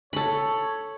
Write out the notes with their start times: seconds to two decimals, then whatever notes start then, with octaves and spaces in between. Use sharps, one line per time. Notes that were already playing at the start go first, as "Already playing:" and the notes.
0.13 A4 C#5 B5